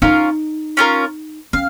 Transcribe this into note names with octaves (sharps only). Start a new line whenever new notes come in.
C#4 D#4 F4 A#4
C#4 F4 A#4
C#4 F5